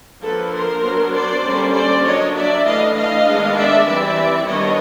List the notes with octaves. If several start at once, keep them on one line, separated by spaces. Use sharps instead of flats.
D3 F3 A#3 A4 B4
A#4 C5
F#3 B3 D4
C5 D5
D3 G3 A#3 C#4
C5 D5
F#3 A#3 D4 C#5 D#5
D5 E5
E3 A3 D4 D#5 F5
D#5 F5
D#3 G#3 B3 D4
D5 E5
E3 G3 C4 D5 E5
D#3 G3 B3 D4 C#5 D#5